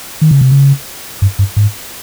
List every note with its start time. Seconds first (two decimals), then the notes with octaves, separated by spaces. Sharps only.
0.21 D#3
0.31 C#3
0.41 C3
0.51 C#3
1.22 G2
1.39 G2
1.56 G#2